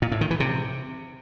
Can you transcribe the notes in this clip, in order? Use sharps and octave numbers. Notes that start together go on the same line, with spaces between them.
A#2
A2
D#3
E3
C3